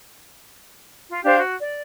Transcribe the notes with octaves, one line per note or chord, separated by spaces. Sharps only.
F4
D4 G4 C5 F5
F#4
D5